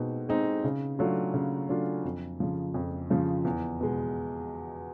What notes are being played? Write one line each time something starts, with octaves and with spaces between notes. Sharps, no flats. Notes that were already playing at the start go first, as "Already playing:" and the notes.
Already playing: B2 G#3 C4 D#4
G#3 C4 D#4
C#3
F#3 A3 D4 F4
C#3
F#3 A3 D4 F4
F2
C#3 F3
F2
C#3 F3
E2
B2 G#3